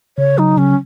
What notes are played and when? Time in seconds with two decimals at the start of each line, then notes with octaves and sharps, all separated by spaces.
0.17 C#3 C#5
0.38 F#3 D#4
0.56 C#3 C#4